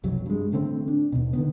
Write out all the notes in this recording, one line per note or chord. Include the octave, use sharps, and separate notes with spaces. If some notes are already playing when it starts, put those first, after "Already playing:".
F1 B1 F2 F#3
G2 G#3
A1 D3 A3 C4
D4
D#2 B2
D3 D#3 B3